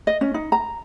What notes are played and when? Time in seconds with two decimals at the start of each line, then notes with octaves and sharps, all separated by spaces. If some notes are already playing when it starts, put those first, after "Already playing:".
0.07 D#5
0.21 C#4
0.34 D#4
0.52 A#5